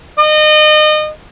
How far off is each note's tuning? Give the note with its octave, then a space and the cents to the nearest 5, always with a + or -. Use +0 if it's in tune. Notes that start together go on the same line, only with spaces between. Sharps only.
D#5 -30